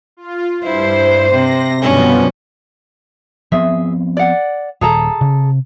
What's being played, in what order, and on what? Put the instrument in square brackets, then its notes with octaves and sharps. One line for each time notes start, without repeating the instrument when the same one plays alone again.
[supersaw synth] F4
[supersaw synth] G2 [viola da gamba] E4 [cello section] C5
[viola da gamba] C3 [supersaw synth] A#6
[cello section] F#2 D3 [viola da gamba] B2 C#4 [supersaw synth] F3 G3 B3
[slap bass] F3 B3 C4 [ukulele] G#4 E5
[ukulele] D5 F#5
[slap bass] D#1 [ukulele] G#4 A4 A#5
[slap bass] C3